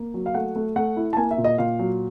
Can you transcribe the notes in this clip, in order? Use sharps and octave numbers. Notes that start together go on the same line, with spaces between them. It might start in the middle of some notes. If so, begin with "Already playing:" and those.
Already playing: A#3
F#3
F5
A3 F#5
A3
A3 F#5
E4
A5
A#3 G#5
E5
A#2
D#5
A#2 F5
F#3